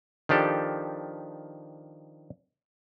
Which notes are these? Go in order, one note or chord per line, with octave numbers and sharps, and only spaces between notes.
D#3 F3 D4 G4 A4